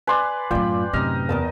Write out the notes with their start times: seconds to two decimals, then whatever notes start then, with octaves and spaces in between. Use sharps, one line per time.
0.07 B4 D5 G#5 C6 F#6
0.51 F#2 A2 F4 D5 G5
0.93 F#2 A2 C3 D#4 D#5 F6
1.29 E2 A#4 D#5 A5